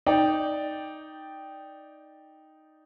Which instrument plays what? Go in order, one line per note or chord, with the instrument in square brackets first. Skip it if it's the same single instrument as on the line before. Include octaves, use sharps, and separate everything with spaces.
[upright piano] D#4 D5 G5